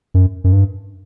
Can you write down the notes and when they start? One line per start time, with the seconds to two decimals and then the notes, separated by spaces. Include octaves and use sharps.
0.14 F#2
0.44 F#2
0.53 G2